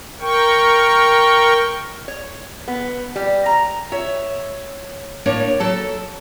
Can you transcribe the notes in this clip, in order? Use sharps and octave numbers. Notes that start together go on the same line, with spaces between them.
A#4 G5 C#6
C#5
B3
G3
A#5
C#5 E5
A2 A#3 D4 C#5
F#3 A4 A5